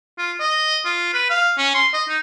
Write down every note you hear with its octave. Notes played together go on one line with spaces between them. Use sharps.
F4
D#5
F4
B4
F5
C#4
C6
D#5
D#4